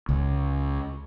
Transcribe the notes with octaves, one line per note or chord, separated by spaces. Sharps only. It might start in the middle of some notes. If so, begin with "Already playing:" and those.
C#2